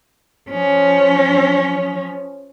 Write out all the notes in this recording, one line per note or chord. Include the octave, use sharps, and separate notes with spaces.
F3 C#4